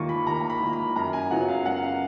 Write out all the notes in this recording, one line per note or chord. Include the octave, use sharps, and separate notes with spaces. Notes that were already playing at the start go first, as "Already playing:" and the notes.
Already playing: D#2 D#3 A#3 F4 C#6
B5
D#2 A#5
A#5
B5
D#3 A#3 F4
B5
F#2 A#5
G#5
C#3 F#3 B3 F4 F#5
F5
F#2 F#5
F5